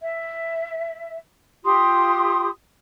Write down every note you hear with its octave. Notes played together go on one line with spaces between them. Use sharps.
E5
F4 G4 C6 D#6